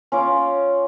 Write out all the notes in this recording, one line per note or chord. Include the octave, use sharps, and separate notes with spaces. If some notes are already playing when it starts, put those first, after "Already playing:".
C#4 F4 D6